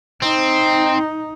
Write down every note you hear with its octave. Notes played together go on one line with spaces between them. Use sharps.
C4 D#4